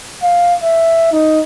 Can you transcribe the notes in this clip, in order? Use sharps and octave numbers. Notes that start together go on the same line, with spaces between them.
F5
E5
D#4